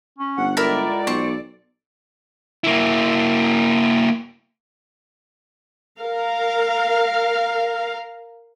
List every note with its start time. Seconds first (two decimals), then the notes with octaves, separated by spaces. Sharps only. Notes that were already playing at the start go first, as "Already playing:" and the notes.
0.19 C#4
0.38 G1 F#5
0.57 C#2 E4 A4 A#4 D5 E5
1.07 B1 C5 C#6
2.64 A#3 E4
5.99 A#4 F5